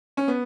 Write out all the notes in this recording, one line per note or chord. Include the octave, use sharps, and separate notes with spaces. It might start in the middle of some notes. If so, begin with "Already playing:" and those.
C#4
B3